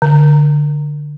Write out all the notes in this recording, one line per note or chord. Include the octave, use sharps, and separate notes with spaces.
D3